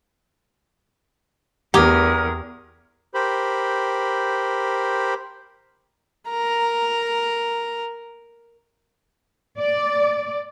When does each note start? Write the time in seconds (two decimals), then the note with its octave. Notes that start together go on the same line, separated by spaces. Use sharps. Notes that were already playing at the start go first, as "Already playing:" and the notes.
1.74 E2 G4 A#4 A#5 D#6 G#6
3.14 G4 A#4 C5 B5
6.29 A#4 A#5
9.58 D5